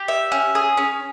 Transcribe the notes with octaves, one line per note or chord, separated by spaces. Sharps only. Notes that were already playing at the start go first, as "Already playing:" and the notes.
Already playing: G4
E5
C#4
G#4
C#4